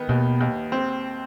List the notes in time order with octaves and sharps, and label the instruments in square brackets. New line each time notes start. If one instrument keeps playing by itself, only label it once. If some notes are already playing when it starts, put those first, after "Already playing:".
Already playing: [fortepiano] D#3 B3
[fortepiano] D#2 [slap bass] B2
[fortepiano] D#2
C4